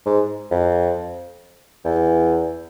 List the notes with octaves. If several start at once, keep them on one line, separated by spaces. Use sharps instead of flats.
G#2
F2
E2